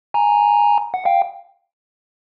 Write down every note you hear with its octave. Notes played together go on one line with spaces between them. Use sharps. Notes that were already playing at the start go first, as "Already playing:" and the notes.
G#5 A#5
F#5
F5 G5